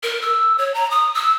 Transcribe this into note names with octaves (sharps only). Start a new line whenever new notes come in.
A#4
E6
C#5
A#5
D#6
E6